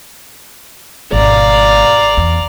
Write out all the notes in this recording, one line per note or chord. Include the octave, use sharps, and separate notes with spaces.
G#1 B2 D5 F5 A#5
E2